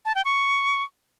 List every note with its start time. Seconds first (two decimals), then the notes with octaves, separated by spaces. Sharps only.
0.05 A5
0.15 G5
0.25 C#6